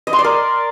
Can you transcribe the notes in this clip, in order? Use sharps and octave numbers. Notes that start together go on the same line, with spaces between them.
D#5
C6
D5
A#4